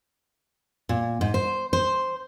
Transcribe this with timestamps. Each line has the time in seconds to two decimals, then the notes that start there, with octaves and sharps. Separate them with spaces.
0.89 A#2
1.21 G#2
1.34 C5
1.73 C5